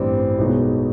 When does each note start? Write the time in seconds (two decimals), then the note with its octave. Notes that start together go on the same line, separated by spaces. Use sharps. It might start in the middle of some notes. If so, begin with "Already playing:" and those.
Already playing: A1 G2 E3 G3 C4
0.38 B1 B2 G#3 B3 D#4